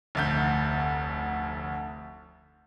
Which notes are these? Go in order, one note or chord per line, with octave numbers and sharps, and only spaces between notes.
F1 D2 G6